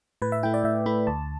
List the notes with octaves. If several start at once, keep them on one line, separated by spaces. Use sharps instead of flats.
A2 B4
E5
A3 E4 G5
D5
A2 E5
A3 E4 B5
D2 A5